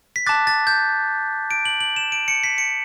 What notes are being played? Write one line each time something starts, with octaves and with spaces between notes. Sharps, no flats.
B6
A5 D6 F#6 A6
A6
G6
D7
F#7
F#7
E7
D7
C#7
B6
C#7